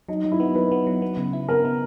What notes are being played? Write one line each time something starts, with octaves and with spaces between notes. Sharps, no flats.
F#3 D#4
F#3
E4
B3
F#3 B4
B3
F#3
B3
C#3
E4
B3 A#4
B3